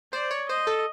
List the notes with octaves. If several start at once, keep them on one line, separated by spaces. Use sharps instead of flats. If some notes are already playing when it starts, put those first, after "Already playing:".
C5 D5
C#5
C5 D#5
A4